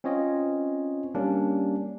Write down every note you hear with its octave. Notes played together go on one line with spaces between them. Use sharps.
C4 C#4 F4 C#5 D#5
G3 A#3 C#4 D4